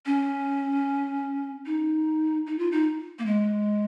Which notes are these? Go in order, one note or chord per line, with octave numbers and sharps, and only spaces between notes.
C#4
D#4
D#4
F4
D#4
A#3
G#3